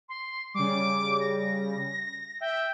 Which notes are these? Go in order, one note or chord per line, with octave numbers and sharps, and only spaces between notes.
C6
C#3 G3 D6
A#6
E5 G5